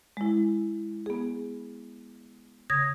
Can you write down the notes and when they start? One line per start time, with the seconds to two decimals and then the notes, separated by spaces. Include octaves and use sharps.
0.17 G#3 E4
1.06 B3 G#4
2.70 C#3 D#6 G#6 A#6